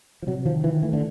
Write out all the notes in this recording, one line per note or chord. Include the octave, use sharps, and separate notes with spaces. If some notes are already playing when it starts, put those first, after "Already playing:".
F3
C3 F#3
D#3 F3
D#3 E3
E3 A3
D3